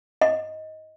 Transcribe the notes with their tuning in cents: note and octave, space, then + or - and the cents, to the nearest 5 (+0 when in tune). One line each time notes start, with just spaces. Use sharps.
D#5 +15